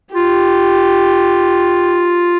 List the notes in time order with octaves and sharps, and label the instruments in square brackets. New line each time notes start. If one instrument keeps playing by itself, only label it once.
[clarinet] F4 [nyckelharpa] G4